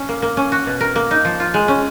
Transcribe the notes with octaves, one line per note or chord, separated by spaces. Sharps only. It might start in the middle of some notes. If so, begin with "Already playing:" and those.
Already playing: C#4
A#3
A#3
C#4
F#4
B2
A#4
A#3
D#4
F3
F4
G#3
C#4